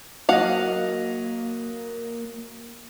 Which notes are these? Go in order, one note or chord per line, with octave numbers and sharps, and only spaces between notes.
F#3 A#3 D#5 F5 F#5